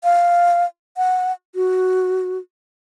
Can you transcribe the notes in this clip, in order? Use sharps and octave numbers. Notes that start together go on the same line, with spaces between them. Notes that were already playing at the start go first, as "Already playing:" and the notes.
F5
F#5
F#4